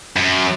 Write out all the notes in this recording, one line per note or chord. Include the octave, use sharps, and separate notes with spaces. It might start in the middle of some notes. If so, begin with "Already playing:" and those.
F#2